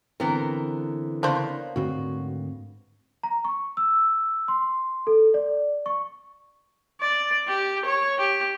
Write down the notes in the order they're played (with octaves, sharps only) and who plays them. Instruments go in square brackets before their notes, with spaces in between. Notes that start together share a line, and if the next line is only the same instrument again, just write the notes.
[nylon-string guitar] D3 E3 C4 [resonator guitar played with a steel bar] B3 A#4
[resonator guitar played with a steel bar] C#3 A#3 B3 [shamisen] D4 C5
[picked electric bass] D2 G#2 C4 [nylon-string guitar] F#4
[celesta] A#5
C#6
E6
C6
A4
D5
C#6
[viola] D5
G4
C#5
G4